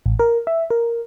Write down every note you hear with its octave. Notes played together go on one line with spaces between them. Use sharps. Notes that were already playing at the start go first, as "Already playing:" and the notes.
A1
A#4
E5
A#4